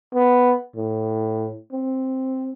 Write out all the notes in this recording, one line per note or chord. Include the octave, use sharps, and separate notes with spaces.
B3
A2
C4